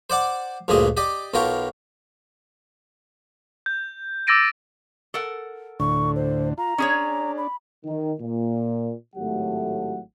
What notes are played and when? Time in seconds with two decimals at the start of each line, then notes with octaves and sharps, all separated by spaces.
0.10 C5 D5 F#5 D6
0.68 D2 G2 A#2 C4 G#4 D#5
0.97 G4 D5 D#5
1.34 B1 B2 F4 A#4 C#5 G5
3.66 G6
4.27 D6 E6 A6 A#6 D7 D#7
5.14 A4 A#4 F#5
5.80 D2 A2 D3 C#6
6.16 C5
6.58 F4 A#5
6.78 C#4 D4 G#4 C#5
7.38 B5
7.85 D#3
8.20 A#2
9.16 G#1 A2 F#3 A3 G4 F#5